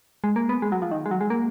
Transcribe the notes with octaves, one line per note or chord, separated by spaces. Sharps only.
G#3
A#3
B3
G#3
F#3
F3
D#3
G#3
F#3
G#3
A#3